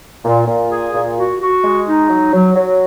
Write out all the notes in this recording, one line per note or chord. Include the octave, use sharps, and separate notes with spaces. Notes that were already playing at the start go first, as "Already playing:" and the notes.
A#2
A#2
G#4
A#2
F#4
F#4
G#3
D#4
F#3
F#3
F#3